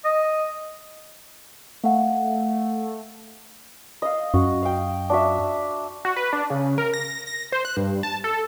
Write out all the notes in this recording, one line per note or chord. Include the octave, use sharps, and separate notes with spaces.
D#5
A3 F5 F#5
D#5 F5
F#2 F#4
F5 G5
D4 F#4 E5
F#4
B4
D4
C#3
A#4
A#6
A#6
C5
F#6
G2
A5
A4